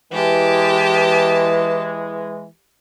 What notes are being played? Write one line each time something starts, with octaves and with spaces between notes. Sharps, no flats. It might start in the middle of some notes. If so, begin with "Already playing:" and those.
E3 G#3 G4 A5